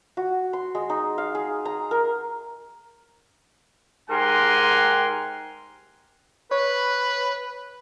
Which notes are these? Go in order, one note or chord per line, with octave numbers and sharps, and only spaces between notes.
F#4
C6
G#3
D#4
F5
G#4
A#5
A#4
G#2 G4 A#4 F#5 G#5 C6
B4 C#5